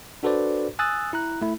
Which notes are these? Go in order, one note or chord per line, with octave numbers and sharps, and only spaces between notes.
D4 F#4 A4 B4 C5 D5
G#5 D#6 E6 F#6 A6
E4 A#5 F#6
A3 E4